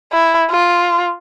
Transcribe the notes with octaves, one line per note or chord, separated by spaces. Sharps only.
E4
F4